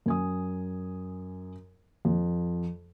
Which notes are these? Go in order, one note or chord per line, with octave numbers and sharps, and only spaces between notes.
F#2 G#5 D#6
F2